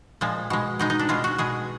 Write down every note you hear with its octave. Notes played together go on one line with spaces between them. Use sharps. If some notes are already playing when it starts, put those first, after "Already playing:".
A#2 F3 G#3
B2 G#3
B2 G#3 D#4
D#4
D4
B2 G#3 F4
F#4
B2 G#3 G#4